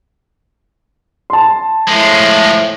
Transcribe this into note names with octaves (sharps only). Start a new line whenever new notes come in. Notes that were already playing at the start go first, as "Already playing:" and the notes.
A5 C6
A2 F3 G#3 A3